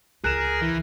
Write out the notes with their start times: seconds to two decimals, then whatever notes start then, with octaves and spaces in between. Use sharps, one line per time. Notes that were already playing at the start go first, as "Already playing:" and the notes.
0.24 C#2 G#4 A#4 F#6 E7
0.62 E3